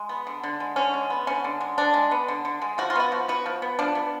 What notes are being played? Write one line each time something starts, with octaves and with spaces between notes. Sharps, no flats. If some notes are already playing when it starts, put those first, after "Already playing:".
Already playing: G#3
B3
D3
D3
G#3
D3 C#4
G#3
B3
D3 C#4
D3
G#3
D3 D4
G#3
B3
D3
D3
G#3
F3 F#4
F4
B3 F#4
F3
B3 F#4
F3
B3
F3 D4
B3